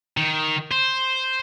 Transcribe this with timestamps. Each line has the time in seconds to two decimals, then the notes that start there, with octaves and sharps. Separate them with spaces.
0.17 D#3
0.71 C5